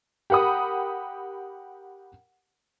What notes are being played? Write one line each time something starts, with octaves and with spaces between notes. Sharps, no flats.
G4 A#4 F#5 B5 D#6